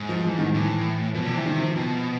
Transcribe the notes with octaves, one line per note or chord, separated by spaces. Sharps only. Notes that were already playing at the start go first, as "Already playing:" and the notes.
Already playing: G#2
F3
E3
D#3
A2 E3
B2 F3
D3 E3
C3
D#3
F3
B2